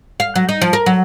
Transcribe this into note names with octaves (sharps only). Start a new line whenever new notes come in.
F5
F#3
D#4
F3
A#4
F#3